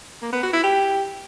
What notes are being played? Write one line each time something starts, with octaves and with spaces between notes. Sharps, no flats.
A#3
B3
F#4
E4
G4